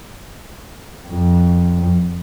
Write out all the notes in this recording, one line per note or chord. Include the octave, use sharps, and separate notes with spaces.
F2